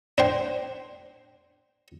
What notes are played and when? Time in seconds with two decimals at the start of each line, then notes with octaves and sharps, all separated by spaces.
0.18 D4 C5 G5